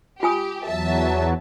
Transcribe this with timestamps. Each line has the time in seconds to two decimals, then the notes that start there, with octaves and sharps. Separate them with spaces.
0.23 F4 G4 G#5 D#6
0.67 E2 F#3 E5 A5